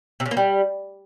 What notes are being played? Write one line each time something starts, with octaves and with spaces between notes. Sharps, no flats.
C3
C#3
A#3
G3